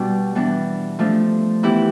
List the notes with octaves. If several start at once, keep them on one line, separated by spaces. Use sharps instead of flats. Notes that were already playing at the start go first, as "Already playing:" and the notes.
Already playing: B2 G3 D4 G4
E3 G3 B3 D4
F3 A3 D4
E3 B3 E4 G4